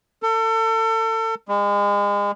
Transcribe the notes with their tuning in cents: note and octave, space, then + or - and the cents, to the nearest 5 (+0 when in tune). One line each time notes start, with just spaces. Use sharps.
A4 +35
G#3 -35